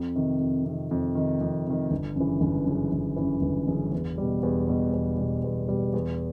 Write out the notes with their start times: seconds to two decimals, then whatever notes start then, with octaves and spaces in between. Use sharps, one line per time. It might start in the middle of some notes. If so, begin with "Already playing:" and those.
Already playing: F2
0.16 C3 D#3
0.40 F2
0.65 C3 D#3
0.91 F2
1.15 C3 D#3
1.41 F2
1.66 C3 D#3
1.91 G1
2.16 F#2 C#3 E3
2.41 G1
2.66 F#2 C#3 E3
2.92 G1
3.16 F#2 C#3 E3
3.42 G1
3.67 F#2 C#3 E3
3.92 E2
4.18 B2 G3
4.43 E2
4.68 B2 G3
4.93 E2
5.18 B2 G3
5.44 E2
5.68 B2 G3
5.94 E2